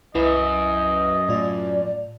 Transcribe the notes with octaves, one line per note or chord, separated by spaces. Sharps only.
C2 F#2 E4 B4 D#5
A2 F4 D5